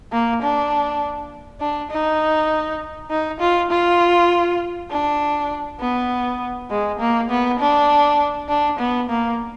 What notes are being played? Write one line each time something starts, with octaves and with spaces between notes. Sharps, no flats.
A#3
D4
D4
D#4
D#4
F4
F4
D4
B3
G#3
A#3
B3
D4
D4
B3
A#3